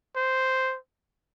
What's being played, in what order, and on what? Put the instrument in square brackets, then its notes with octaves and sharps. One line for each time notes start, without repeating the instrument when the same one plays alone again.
[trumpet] C5